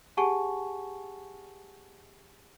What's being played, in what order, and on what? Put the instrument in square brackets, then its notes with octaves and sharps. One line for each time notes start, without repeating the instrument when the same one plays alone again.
[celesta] G4 G#4 F#5 G#5 A5 C#6